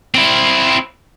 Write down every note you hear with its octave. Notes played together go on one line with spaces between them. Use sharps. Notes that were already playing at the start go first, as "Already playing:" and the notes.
C4 E4